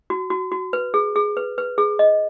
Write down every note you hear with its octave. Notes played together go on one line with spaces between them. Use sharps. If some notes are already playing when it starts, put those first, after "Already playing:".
F#4
F#4
F#4
B4
G#4
G#4
B4
B4
G#4
D#5